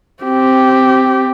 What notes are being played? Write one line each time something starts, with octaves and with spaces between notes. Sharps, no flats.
C4 G4